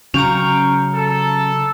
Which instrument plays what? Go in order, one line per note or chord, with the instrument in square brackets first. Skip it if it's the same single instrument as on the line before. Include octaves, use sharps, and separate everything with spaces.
[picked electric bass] C#3 F#3 [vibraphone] C#4 A#5 [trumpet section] F5 G5 C#6
[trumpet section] A4